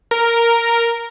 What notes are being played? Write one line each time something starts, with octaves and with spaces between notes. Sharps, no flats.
A#4